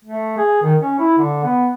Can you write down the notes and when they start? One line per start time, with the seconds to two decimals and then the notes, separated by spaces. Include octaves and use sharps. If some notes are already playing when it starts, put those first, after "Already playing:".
0.04 A3
0.38 G#4
0.63 D#3
0.81 C#4
0.99 E4
1.18 D3
1.44 B3